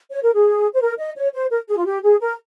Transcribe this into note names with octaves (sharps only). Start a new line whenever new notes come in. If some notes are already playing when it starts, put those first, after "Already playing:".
C#5
A#4
G#4
C5
A#4
D#5
C#5
C5
A#4
G#4
F4
G4
G#4
A#4